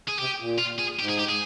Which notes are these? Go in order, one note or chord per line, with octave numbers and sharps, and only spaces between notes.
G#4
C3 G4
A#2
F4
G#4
G#2 G4
G#4
G4
G#4